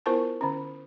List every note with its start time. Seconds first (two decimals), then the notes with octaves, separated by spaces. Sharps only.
0.06 B3 E4 F4 A#4 C5 A5
0.41 D3 C#4